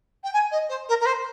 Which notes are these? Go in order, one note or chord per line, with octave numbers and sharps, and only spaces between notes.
G5
G#5
D#5
C5
A#4
A#4
C5